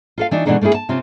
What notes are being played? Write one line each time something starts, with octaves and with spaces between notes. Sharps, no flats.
F4 A4 F5
E3 D4 D#4 F#4
B2 E3 G#3 D4 D#4 A4
A3 A#3 C#4 E4 G#4
A5
C3 C4 C#4 F4 G4